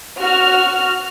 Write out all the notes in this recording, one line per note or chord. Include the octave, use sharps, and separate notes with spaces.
F#4 F6